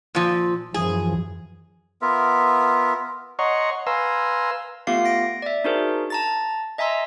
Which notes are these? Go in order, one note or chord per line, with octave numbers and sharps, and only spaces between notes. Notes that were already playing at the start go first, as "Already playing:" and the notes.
A#2 F3
F#2 E3 F3 G#4
B3 F4 A#4 E5
C#5 D#5 F#5 A#5 C6 C#6
B4 F5 G#5 A#5 C6 E6
A3 B3 F4 G4 F5 C7
A#6 D7
D5 E5
D4 D#4 F#4 G#4 A#4 C5
A5 A#5 A6
D#5 E5 G#5 A#5 C6 E6